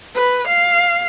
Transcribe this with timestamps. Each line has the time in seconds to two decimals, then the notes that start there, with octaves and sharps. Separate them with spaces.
0.15 B4
0.47 F5